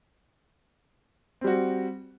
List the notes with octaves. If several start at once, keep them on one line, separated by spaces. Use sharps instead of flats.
G3 C4 F#4